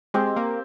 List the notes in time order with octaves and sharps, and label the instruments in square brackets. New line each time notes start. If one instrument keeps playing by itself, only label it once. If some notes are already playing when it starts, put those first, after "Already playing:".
[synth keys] G#3 [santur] C4 G4 C5
[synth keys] A#3